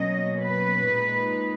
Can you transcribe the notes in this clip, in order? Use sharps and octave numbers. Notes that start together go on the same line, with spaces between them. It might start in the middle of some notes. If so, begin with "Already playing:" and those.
Already playing: B2 F#3 A#3 C#4 D#5
B4
A#2 G#3 D#4